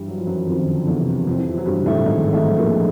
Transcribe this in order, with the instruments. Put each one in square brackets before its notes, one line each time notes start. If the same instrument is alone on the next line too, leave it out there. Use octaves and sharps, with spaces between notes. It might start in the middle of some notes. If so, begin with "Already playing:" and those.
Already playing: [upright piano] G2 G3 [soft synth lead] E3
[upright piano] F#3
F3
F#2 F#3
[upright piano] F2 F3 [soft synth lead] D#3
[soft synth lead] D3
[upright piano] E2 E3
[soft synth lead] C3
[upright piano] F2 F3 [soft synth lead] C3
[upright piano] E3
F3
[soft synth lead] C3 [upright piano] F#3
[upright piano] G2 G3
[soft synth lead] C#3
[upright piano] A2 A3
[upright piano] G#2 G#3 [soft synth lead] D#3
[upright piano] A2 A3 [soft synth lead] D#3
[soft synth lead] F#3
[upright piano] A#2 A#3 [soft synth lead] F3